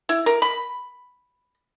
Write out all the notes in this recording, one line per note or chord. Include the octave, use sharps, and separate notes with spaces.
E4
A#4
B5